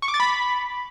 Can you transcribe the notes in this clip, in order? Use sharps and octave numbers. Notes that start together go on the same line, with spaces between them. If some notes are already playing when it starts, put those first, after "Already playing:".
C#6
D6
A6
B5